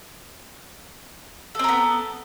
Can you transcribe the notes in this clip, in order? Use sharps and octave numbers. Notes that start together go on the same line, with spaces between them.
B3 C4 A4 A#4